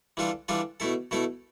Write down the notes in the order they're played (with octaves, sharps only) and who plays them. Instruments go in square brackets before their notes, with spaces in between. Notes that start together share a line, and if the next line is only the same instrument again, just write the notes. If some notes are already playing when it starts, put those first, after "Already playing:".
[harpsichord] E3 G3 D4 F4 A4
E3 G3 D4 F4 A4
B2 A3 E4 A4
B2 A3 E4 A4